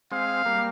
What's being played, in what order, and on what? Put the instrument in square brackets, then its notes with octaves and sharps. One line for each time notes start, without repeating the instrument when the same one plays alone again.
[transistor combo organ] G#3 C4 [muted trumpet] F5
[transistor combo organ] G3 A#3